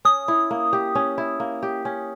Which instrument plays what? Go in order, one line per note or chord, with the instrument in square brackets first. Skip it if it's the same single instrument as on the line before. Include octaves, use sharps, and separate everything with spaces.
[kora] C#4 [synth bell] D#6
[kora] E4
A#3
G4
C#4
E4
A#3
G4
C#4